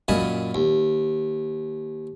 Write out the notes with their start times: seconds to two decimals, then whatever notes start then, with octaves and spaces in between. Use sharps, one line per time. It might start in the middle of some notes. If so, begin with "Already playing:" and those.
0.08 F#2 A#2 D#5 G#5 A5 B5
0.55 D#2